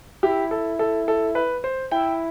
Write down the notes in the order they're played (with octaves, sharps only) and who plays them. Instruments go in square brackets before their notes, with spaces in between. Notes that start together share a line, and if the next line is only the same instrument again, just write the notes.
[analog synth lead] E4 [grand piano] G4
[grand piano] A4
A4
A4
B4
C5
[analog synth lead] E4 [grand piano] G5